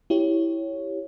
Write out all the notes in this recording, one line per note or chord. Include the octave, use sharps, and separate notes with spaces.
E4 G4 C#5